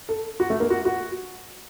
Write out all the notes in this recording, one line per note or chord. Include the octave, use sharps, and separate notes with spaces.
A4
F#4
A3
A#3
F#4
F#4